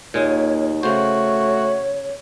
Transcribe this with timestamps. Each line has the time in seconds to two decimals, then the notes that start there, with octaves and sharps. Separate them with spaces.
0.14 D#2 A#2 G#3 C#5
0.83 C#3 A3 F#4 C5 C#5